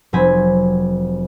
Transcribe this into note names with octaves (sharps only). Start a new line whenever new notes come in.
F1 F#3 C4 G#5 B5